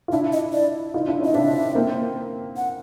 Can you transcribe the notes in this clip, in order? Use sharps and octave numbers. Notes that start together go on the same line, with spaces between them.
F4
D4 E4 E5
D#5
D5
D#4 F4
D4 E4
C#4 D#4 D#5
C4 D4 E5
A#3 C4
F#5